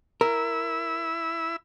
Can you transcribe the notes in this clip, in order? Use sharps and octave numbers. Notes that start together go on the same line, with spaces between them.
E4 A#4 E6